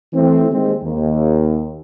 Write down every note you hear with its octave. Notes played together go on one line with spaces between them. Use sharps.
E3 A3 C4
D#2 G#3 C4
D#2